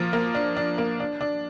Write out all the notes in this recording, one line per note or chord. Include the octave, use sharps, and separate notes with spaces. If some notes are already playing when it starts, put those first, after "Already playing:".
Already playing: F3 A#3
A#3
D4
D4
A#3
D4
D4